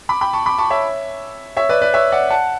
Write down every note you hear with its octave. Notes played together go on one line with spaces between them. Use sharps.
B5 D6
G5 B5
A5 C#6
B5 D6
A5 C#6
C#5 E5
C#5 E5
B4 D5
B4 D5
C#5 E5
D5 F#5
F#5 A5